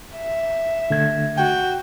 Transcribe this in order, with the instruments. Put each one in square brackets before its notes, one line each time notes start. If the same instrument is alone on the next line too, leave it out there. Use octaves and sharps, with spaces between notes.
[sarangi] E5
[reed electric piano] D3 A3 G#6
[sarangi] F#4 [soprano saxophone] G5